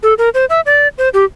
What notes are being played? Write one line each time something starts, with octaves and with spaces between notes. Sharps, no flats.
A4
A#4
C5
E5
D5
C5
G4